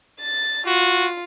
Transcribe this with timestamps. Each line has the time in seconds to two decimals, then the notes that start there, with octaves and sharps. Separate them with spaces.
0.21 A6
0.67 F4 F#4